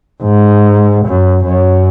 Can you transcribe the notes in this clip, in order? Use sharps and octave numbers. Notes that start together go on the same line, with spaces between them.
G#2
F#2
F#2